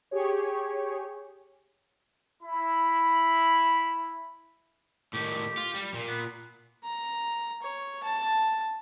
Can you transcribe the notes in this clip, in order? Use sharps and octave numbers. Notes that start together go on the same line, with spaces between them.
G4 G#4 C#5
E4 B5
A2 D#3 G4
F4
G3
A#2
B3
A#5
C#5
A5